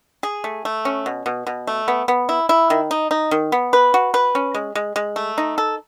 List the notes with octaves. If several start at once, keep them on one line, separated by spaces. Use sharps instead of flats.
G#4
A3
A3
C#4
B2
B2
B2
A3
B3
B3
E4
E4
D#3
D#4
D#4
D#3
B3
B4
F#4
B4
C#4
G#3
G#3
G#3
A3
D#4
A4